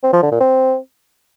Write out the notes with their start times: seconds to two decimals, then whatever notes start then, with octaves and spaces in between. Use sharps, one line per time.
0.04 C4
0.13 F3
0.22 D3
0.31 A#2
0.41 C4